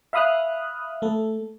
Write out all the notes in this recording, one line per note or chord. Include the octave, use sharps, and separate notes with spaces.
E5 F5 B5 D#6 F6 F#6
A3 A4